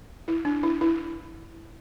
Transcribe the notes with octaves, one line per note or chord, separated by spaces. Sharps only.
E4
D4
E4
E4